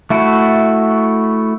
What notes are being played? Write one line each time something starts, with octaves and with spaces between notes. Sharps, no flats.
A3 E4 F#4